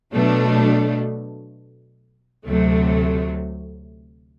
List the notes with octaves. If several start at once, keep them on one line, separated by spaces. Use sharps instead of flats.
B2 F#3 A3 D4
D2 C3 F#3 A3